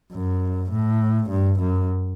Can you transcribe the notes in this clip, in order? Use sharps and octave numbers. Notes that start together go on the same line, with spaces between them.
F#2
A2
G2
F#2